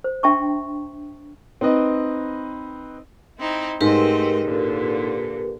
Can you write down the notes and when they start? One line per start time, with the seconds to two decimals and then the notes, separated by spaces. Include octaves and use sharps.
0.04 C5
0.23 D4 E5 G5 A5 C6 C#6
1.61 C4 D#4 B4 D#5
3.38 C4 D#4 E4
3.81 G#2 A3 C4 G4 A#4 B4 D#5
4.44 A#2 D3